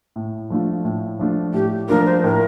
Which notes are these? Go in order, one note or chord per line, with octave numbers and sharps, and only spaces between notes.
A2
F3 A3 D4 F4
A2
F3 A3 D4 F4
A2 G4
F3 A3 D4 F4 A#4
C5
A2 A#4